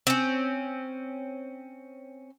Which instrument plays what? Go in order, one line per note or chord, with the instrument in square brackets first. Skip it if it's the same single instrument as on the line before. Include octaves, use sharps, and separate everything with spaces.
[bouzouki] C4 C#4